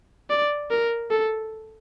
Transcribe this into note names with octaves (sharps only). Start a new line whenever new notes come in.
D5
A#4
A4